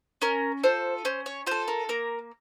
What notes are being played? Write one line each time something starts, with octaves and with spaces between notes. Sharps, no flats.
C#4 A#4
F4 A4 C5
C#4 C5
C#5
F4 A4 C5
A#4
A#3 A#4